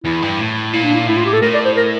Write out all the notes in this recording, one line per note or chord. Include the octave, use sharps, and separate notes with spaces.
E2 E4
G2
A2
A#2 E4
D4
E4
A2 E4
F4
G4
A4
A2 A#4
D5
C5
A#4